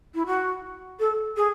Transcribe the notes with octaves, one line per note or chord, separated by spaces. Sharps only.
E4
F#4
A4
G#4